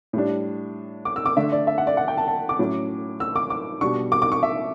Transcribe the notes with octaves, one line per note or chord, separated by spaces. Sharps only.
A2 G3 D4
D6
E6
D6
D3 A3 D4 E5
D5
E5
F#5
D5
F#5
G5
A5
A5
D6
A2 F#3 C#4
E6
D6
D6
B2 G3 D4 C#6
D6
D6
C#6
E5